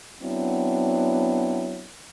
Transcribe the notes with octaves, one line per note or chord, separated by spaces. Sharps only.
F#3 B3 C4 D4 E4